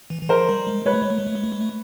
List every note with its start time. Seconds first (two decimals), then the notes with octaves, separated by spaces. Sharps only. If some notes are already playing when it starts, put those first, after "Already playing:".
0.10 E3
0.23 E3
0.29 F3 A#4 C5
0.49 G3
0.67 G#3
0.86 G#3 B4 C#5
0.93 A3
1.02 G#3
1.10 A3
1.18 G#3
1.27 A3
1.35 G#3
1.44 A3
1.52 G#3
1.61 A3